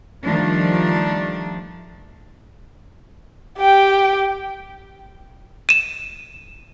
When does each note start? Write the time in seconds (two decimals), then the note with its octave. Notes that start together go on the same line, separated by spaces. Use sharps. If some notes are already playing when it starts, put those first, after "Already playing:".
0.24 D#3 F3 G3 A3 D4
3.58 G4 G5
5.69 D#7 E7